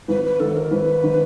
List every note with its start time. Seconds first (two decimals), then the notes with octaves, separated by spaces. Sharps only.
0.08 G#1 B4
0.24 B4
0.40 G#2 D#3 A4
0.56 A#4
0.71 G#1 B4
1.04 D#3